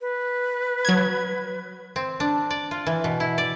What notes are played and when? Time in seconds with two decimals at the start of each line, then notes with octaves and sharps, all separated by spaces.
0.01 B4
0.85 F#3 G#6
1.96 C4
2.20 D4
2.50 D5
2.71 F4
2.87 E3
3.04 B2
3.20 E4
3.38 D5